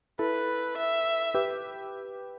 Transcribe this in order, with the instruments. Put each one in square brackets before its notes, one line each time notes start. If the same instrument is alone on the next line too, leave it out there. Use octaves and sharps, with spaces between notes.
[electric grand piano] E4 A4 [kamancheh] B4
[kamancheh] E5
[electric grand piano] G4 B4